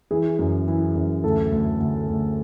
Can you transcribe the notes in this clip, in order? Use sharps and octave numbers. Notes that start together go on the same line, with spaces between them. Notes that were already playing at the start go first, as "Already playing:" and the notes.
E3 G#4
F#2
E3
F#2
D2 A4
D2
D2
D2